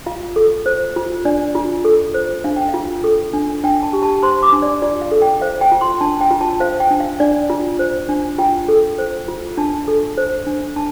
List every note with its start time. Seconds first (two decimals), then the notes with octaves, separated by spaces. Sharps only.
0.06 F4 F5
0.36 A4
0.66 C5
0.96 F4
1.25 D4 D5
1.55 F4
1.85 A4
2.14 C5
2.44 D4 F5
2.56 G5
2.69 F4 F5
3.04 A4
3.34 D4
3.64 D4 G5
3.83 A5
3.93 G4
4.03 A5
4.23 C5 C6
4.43 D6
4.53 D4
4.62 D5
4.82 F4 D5
5.02 F5
5.12 A4
5.22 G5
5.41 C5 F5
5.61 G5
5.72 F4
5.81 C6
6.01 D4 A5
6.21 G5
6.31 F4
6.41 A5
6.60 C5 F5
6.80 G5
6.91 D4
7.00 F5
7.20 D4 D5
7.50 F4
7.79 C5
8.09 D4
8.38 F4 G5
8.68 A4
8.98 C5
9.28 F4
9.57 D4 A5
9.88 A4
10.18 C5
10.47 D4
10.76 D4 A5